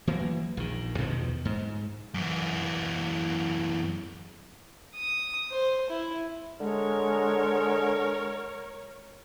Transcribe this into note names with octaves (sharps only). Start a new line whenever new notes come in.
E3 F#3 A#3
A#1 D#3
E2 B2 D#3 F3
G#2
F#2 E3
D#6
C5
E4
D3 G#3 A#4 C#5